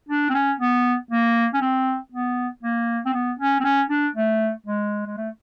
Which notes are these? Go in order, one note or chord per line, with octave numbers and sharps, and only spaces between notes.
D4
C4
C#4
B3
A#3
C#4
C4
B3
A#3
C4
B3
C#4
C4
C#4
D4
A3
G#3
G#3
A3